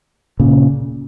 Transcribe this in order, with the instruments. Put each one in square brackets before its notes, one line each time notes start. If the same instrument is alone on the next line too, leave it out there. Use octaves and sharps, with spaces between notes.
[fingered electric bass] A#2 C#3